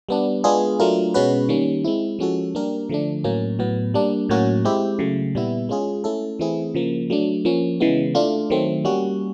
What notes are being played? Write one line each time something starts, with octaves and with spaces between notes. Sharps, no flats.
G3 B3 D4
G#3 B3 D4 F4 G#4
F#3 A3 D4 F4 A#4
B2 G#3 C#4 F#4 B4
D#3 G3 A#3 C#4
G#3 C4 E4
F3 G#3 C#4 F#4 A4
G3 A#3 D4 G4 A#4
D3 F3 A3 D4
A2 F#3 A#3 C#4
A2 F#3 B3
G3 A#3 D4
A2 F#3 A#3 C#4 F#4
G#3 C4 E4 G4
C#3 F#3 A3
A#2 G3 B3 E4
G#3 C#4 F4 G#4
A3 C#4 E4 A4
E3 A3 C4 E4 G#4
C#3 F3 A#3
F#3 A3 D4
F3 A#3 C#4
C#3 E3 G#3 B3
A3 D4 F4
D#3 F#3 A3 C4
G3 A#3 C#4 F#4